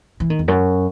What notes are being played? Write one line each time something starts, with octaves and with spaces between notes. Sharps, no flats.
E3
D#3
E2
F#2